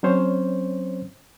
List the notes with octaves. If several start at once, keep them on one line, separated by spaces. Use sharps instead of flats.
F#3 C4 C#4 C5 C#5